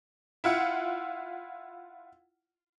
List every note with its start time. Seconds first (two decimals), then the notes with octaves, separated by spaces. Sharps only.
0.44 E4 F4 F#5